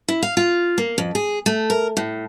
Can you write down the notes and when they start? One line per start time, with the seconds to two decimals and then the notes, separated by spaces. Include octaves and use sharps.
0.08 E4
0.22 F5
0.37 F4
0.78 A#3
0.98 F2
1.15 G#4
1.46 A3
1.70 A#4
1.97 A2